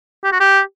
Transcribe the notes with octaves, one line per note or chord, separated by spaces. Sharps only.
G4
F#4
G4